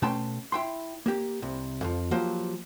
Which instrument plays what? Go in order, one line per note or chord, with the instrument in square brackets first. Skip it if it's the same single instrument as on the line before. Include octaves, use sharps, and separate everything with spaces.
[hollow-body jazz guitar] B2 A3 C#4 G5 A5 C6
E4 G5 C6
A#3 G4
C2 C3
F2 F3
F3 F#3 A#3 G4 C5